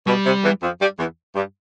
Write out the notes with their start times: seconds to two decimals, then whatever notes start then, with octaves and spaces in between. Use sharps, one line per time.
0.07 B2 G3
0.25 C3
0.44 E2 E3
0.62 F2 F3
0.80 G2 G3
0.99 E2 E3
1.35 G2 G3